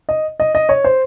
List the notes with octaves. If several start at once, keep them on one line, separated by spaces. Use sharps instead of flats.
D#5
D#5
D#5
C#5
C5